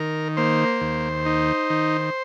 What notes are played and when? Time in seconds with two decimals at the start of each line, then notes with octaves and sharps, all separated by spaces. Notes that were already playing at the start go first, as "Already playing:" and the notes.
Already playing: D#3 A#4
0.37 A#3 C5
0.81 D#2
1.26 D#4
1.70 D#3